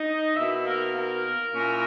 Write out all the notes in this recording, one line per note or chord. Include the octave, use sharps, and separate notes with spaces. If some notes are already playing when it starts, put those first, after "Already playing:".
Already playing: D#4 D#5
B2 A#3 D#4 E4 E5
A#3 A#4
A#3 A#4
A#2 A#3 C#4 E4